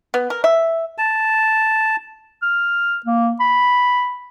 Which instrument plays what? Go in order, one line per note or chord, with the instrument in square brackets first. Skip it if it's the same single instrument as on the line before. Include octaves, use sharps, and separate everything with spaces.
[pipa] B3
A#4
E5
[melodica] A5
[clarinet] F6
A#3
B5